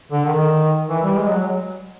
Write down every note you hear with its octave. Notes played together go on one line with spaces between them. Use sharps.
D3
D#3
E3
G3
G#3
F#3